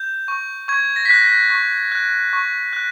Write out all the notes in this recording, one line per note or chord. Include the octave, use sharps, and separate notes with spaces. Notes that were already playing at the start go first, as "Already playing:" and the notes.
Already playing: G6
C#6
C#6 G#6
A#6
B6
F#6 A#6
A#6
C#6
F#6
C#6
F#6